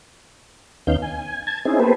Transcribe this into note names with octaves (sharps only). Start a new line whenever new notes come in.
D#2 B3 C#4 D#4 F5 G6
G#5
A5 G#6
C4 C#4 D#4 E4 G#4
A#3 B3 G4 A4 B4 C5